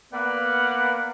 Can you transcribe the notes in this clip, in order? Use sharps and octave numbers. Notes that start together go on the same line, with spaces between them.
A#3 B3 B4 D5 F5 F#5